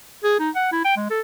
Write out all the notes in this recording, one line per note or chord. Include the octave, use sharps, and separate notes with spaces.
G#4
D#4
F#5
E4
G5
G#3
A4